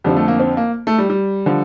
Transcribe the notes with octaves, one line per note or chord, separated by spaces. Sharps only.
F2 D3 F3 G3
A3
A#3
C4
A#3
A3
G3
G3
D3 F3